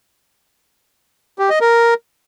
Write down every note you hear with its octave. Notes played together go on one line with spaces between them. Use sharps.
G4
D#5
A#4